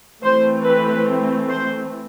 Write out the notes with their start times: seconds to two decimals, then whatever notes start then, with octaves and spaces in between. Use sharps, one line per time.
0.24 E3 A3 C4 C5
0.65 B4
1.50 C5